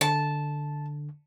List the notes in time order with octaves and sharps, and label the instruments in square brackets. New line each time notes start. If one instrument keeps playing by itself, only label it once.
[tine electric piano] D3 [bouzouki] A5